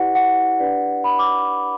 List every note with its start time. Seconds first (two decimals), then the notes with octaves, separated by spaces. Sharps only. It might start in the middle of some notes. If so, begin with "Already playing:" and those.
Already playing: E4 G4 B4 D5 F#5
0.15 F#5
0.59 D4 G4 B4 D5
1.04 B5
1.19 D6